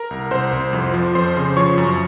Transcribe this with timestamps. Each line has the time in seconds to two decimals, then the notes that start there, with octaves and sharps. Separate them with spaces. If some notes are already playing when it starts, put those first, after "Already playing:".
Already playing: A#4 A#5
0.11 C2
0.31 C2 C5 C6
0.53 C2
0.73 F2
0.94 F3
1.15 F2 C5 C6
1.36 C#3
1.57 F3 C#5 C#6
1.78 F#2